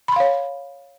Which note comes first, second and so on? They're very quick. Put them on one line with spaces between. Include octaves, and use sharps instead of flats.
B5 C6 F5 C#5